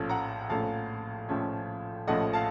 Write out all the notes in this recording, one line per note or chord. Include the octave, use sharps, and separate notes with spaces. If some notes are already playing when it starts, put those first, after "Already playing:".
Already playing: A#1 A2 F3 A3 C#4
F#5 A#5
A#1 A2 F3 A3 C#4 F5 A5
A#1 A2 F3 A3 C#4
A#1 A2 F3 A3 C#4 D#5 F#5
F5 A5